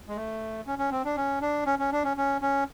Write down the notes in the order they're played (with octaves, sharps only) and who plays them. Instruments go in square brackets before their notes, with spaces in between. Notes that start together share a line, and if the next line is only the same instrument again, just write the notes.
[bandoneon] G#3
A3
C#4
C#4
C4
D4
C#4
D4
C#4
C#4
D4
C#4
C#4
C#4